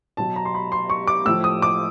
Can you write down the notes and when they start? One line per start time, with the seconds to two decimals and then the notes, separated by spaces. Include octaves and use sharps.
0.17 B2 F#3 A5
0.36 A#5
0.45 C6
0.55 B5
0.72 C6
0.90 C#6
1.07 D6
1.26 A2 F3 E6
1.44 D#6
1.62 D6